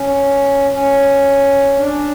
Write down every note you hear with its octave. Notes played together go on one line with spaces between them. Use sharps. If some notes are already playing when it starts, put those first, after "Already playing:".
Already playing: C#4
C#4
D4